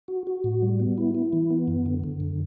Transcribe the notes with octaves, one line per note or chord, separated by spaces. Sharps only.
F#4
F#4
A2
G3
B3
E4
E4
E3
B3
F#2
D3
D3
F#2